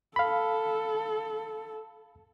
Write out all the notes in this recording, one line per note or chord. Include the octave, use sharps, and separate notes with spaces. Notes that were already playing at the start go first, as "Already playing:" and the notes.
A4 F5 B5